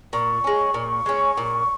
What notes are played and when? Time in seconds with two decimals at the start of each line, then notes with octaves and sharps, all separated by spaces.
0.13 A#2 C#6
0.44 G#3 C#4
0.74 A#2
1.06 G#3 C#4
1.37 A#2